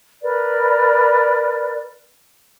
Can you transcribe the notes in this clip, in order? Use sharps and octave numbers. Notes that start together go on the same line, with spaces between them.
A#4 B4 D5